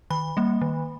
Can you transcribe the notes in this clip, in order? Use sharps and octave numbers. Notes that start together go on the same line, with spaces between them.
D#3 B5
G3 A#3
D#3